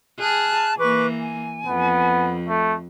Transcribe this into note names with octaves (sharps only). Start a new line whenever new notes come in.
G#4 A5 F6 F#6
E3 A#3 B4 C#6 D6
G#5
F2 B3
A3